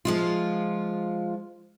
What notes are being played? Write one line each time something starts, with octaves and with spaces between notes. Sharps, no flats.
F3 G#3 F4